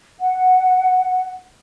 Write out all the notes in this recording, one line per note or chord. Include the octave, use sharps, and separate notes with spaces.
F#5